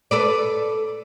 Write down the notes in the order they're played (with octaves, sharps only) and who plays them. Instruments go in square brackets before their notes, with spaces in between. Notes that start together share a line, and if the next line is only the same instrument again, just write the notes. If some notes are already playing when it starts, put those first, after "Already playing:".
[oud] A4 B4 D5